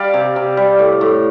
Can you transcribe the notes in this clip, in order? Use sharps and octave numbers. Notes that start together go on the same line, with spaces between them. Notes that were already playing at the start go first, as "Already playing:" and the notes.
Already playing: G3 D5 F5
C3
C3
G3
A2
A2